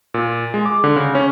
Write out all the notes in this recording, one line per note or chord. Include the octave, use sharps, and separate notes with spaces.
A#2
G#3
D6
D3
C#3
C#4